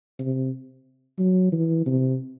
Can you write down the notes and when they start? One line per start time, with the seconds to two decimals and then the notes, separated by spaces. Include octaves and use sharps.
0.19 C3
1.19 F#3
1.52 E3
1.86 C3